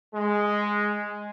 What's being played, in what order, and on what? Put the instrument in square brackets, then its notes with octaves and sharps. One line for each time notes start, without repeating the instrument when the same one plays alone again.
[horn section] G#3